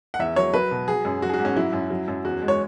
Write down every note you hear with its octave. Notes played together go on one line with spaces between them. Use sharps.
F#5
E2 E5
F#3 C#5
F#3 B4
B2
F#3 G#4
F#2
F#3 F#4
G#4
F#4
G#2
C#4
F#3 E4
F#2
F#3
F#2
E2 F#4
G#3
C#5